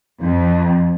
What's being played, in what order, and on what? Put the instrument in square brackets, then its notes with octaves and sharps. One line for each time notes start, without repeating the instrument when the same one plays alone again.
[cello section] F2